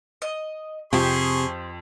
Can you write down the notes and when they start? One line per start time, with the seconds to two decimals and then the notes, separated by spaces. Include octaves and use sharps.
0.22 D#5
0.93 F2 C3 G4 G#4 C5 C6 C#6